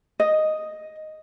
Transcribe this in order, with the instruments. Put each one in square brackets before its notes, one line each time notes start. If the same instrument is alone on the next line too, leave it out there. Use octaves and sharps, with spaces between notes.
[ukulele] D#5